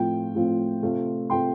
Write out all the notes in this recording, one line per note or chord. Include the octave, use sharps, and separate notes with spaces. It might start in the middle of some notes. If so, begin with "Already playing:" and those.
Already playing: A2 F3 C4 F4 G5
A2 F3 C4 F4
C3 A3 C4 F4
C3 A3 C4 F4 G5 C6